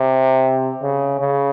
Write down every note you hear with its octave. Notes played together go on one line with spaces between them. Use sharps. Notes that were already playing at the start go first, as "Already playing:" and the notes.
Already playing: C3
C#3
C#3